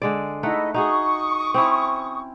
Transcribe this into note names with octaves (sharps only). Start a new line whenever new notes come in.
D3 G#3 D5
A3 D#4 E4 D#5 F#5
D#4 F#4 G#4 C#6 D#6
C4 C#4 E4